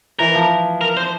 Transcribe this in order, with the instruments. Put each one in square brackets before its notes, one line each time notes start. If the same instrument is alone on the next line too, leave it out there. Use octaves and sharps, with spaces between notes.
[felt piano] E3 [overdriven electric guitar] A#4
[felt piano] F3
[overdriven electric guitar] A#4
C5